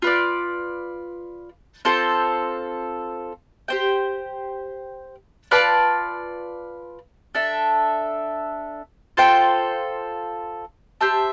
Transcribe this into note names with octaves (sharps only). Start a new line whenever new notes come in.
F4 B4 D5
C4 F4 A4 C5
G4 C5 G5
F4 B4 D5 A5
D4 A4 E5
F4 A4 C5 G5
G4 C5 E5 A5